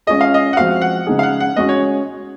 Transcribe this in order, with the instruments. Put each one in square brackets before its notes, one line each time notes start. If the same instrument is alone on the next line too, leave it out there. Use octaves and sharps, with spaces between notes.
[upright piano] G#3 C#4 F4 G#4 [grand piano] D#5
[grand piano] F5
D#5
F#5
[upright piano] F3 G#3 C4 F#4 [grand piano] F5
[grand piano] F#5
[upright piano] C#3 G#3 D#4 G#4
[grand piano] F5
F#5
F#5
[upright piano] G#3 C#4 F#4 [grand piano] D#5
[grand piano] C#5